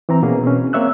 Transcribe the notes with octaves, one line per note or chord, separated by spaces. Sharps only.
E3 C4 A#5
B2 A#3 C#4 G#4
C4 C#4
A#3 C4 C#5 E5 E6 F#6